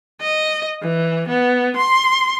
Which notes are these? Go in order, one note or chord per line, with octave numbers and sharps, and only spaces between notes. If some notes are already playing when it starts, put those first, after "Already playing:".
D#5
E3
B3
C6